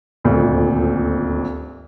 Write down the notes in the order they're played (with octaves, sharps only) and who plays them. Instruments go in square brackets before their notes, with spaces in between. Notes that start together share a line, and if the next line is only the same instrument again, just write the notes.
[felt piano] D#1 G#1 D2 A#2